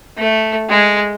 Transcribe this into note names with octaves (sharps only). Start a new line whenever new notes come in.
A3
G#3